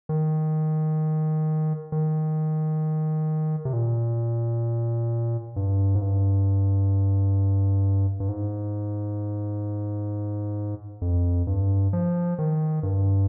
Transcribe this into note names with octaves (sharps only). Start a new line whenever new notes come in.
D#3
D#3
C3
A#2
G2
G#2
G2
G2
G#2
F2
G2
F3
D#3
G2